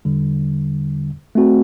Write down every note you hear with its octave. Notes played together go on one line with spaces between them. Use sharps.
E2 D3 G3
A3 C4 F#4